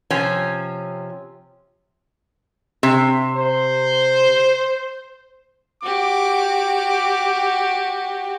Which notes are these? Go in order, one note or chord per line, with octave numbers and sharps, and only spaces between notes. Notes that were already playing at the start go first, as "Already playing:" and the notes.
C3 F3 C#4
C3
C5
F#4 G4 D6